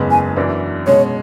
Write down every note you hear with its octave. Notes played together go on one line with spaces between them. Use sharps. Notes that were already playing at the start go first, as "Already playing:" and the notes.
Already playing: F#1 E2 C#3 G#3 B3
G#5
F#2 E3 B3 D4
B2 G#3 C#4 C#5